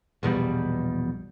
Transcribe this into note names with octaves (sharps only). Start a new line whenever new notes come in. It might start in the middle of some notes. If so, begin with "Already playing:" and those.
A#1 E2 B2 G3